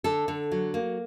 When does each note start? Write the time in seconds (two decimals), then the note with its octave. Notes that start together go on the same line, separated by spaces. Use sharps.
0.04 D3 A4
0.28 D3
0.52 F#3
0.74 A#3